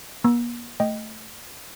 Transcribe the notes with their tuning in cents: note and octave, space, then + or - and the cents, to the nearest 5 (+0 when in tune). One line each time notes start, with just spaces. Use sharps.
A#3 +45 A#5 +30 E6 +0
A3 +0 D#5 +0 G5 +0